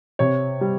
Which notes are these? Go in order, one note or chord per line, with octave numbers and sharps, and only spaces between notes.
C3 C#5
G3